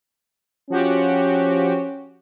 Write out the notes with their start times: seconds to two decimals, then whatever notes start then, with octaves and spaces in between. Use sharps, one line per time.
0.70 F3 C#4 F#4 G4